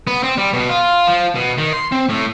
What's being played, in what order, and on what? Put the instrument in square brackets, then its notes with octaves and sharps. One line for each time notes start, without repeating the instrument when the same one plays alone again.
[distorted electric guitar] B3
C4
G3
B2
F4
F3
B2
D#3
C6
C4
A2